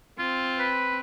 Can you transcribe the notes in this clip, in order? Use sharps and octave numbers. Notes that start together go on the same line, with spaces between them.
C4 F4
B4